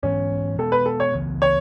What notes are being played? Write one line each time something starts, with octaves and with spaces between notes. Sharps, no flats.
G#2 E3 B3 C#4
B2 G#3 B3 A4
B4
A4
C#5
C#2 C#3 E3 B3
C#5